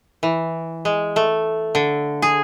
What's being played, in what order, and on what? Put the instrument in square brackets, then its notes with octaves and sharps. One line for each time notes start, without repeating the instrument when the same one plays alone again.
[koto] E3
G#3
A3
D3
G#4